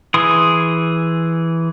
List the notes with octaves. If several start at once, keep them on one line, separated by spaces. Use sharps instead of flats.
E3 G#4 C6 D#6